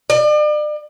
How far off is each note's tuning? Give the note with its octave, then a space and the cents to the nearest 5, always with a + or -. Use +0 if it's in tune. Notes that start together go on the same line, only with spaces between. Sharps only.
D5 +40